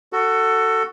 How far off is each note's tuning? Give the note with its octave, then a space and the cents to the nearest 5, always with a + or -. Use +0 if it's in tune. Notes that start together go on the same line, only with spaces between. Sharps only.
F#4 +10 A4 +20